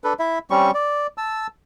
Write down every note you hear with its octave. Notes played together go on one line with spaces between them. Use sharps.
D4 A4 B4
E4 E5
G3 C4 C#4 C#6
D5
A5 E6